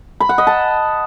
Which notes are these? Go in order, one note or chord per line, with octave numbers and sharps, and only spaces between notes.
B5
F#5
D#5
A5